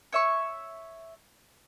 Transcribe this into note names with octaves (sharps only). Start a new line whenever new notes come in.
C#5 E5 C#6